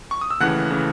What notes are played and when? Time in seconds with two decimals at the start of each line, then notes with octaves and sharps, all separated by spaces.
0.11 C#6
0.21 D#6
0.31 E6
0.40 D#2 C#3 E3 A3 F#5 F#6
0.70 C#3 E3 A3